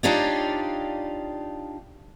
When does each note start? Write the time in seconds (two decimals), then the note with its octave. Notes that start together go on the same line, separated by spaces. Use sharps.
0.03 D4 D#4 F4 G4 C#5 D5